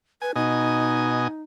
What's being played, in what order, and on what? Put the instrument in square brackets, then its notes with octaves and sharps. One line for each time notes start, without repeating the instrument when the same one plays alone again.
[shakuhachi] B4 [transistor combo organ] G#5
[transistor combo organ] B2 D#5 G#5 [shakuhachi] D#4